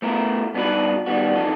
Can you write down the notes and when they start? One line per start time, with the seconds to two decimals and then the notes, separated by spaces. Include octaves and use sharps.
0.02 A3 B3 E4 A#4
0.54 G2 B3 D4 D#4 F#4 B5
1.06 D#3 G3 B3 F#4
1.35 F2 E3 D#4 A4